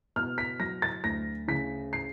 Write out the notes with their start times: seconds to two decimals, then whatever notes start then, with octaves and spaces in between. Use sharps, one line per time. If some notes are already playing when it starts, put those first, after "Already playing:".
0.16 B2 F6
0.38 B6
0.59 F#3 A#6
0.82 A6
1.04 D2 A#6
1.48 C#3 B6
1.93 C7